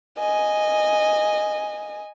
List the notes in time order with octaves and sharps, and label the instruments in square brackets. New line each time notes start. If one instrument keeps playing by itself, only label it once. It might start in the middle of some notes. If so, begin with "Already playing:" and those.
[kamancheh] D#5 G#5